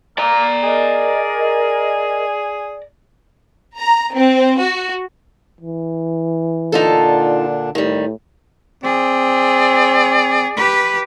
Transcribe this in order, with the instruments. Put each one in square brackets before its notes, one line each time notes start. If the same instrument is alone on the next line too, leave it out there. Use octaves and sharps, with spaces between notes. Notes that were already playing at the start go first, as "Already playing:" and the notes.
[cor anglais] A#3 [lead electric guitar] D5 A#5
[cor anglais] G#4 [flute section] A#4 D#5
[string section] A#5
C4
F#4
[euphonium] E3
[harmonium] A#2 D3 D4 [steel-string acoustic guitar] D#4 F4 A4
[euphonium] A2 [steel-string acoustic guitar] D#3 G3
[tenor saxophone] C4 [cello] G#4 [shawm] D5
[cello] G4 B4